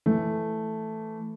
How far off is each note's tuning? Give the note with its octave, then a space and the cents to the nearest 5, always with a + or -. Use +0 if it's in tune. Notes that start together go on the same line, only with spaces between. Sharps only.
E3 +0 A3 +0